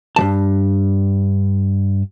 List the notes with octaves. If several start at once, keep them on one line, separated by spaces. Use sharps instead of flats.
G2 E3 A5